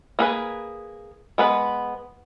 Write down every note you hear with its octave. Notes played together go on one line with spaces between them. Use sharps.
A#3 G#4 B4
G#3 B3 B4